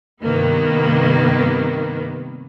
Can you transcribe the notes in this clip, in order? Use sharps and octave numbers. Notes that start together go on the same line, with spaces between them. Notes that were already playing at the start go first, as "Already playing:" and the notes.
G2 C3 D#3 A#3 B3